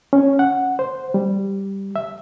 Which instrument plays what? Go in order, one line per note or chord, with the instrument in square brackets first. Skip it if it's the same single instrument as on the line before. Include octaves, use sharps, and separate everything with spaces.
[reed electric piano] C#4
F#5
C5
G3
E5